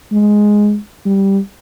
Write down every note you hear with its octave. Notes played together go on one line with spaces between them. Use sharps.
G#3
G3